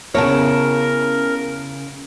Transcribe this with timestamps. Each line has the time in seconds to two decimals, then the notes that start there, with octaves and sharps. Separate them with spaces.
0.14 C#3 B3 E4 A#4 C#5 A5